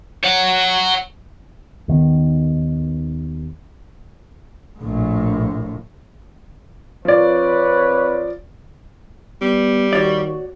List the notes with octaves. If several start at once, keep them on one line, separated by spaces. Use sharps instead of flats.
C#5 F#5
D#2 D#3 B3
A#1 A2
F3 C4 B4 C#5 D5
G3 B3
D#2 F#4 C#5 D5